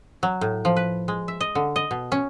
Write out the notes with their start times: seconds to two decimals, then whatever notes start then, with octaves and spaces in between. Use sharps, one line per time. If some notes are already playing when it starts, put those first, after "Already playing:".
0.23 F#3
0.41 A2
0.65 F3
0.76 B4
1.08 G#3
1.28 E5
1.41 D#5
1.55 D3
1.76 D#5
1.91 B2
2.12 C#4